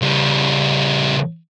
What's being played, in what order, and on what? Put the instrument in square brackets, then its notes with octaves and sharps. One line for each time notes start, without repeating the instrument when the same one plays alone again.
[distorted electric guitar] C#3 G3